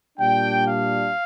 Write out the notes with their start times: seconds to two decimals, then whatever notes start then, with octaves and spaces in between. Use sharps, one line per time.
0.18 A#2 G3 D4 G5
0.65 F5